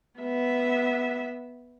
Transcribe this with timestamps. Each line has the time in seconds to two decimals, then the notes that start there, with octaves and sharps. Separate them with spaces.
0.19 B3 E5